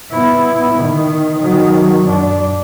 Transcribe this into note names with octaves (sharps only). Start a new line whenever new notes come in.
B3 E4
D#3
D#3 F#3
F#2 D4